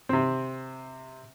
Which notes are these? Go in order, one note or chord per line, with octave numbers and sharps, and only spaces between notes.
C3 C4